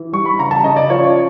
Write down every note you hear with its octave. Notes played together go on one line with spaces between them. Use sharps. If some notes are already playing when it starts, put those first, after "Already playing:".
Already playing: E3
G3 C#6
B5
C#3 A#5
A5
C#3 D#5
D5
F3 C#5